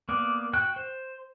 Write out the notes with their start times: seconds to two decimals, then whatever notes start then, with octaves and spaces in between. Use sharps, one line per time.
0.09 A#3 B3 D5
0.53 F#4 G5 F#6
0.76 C5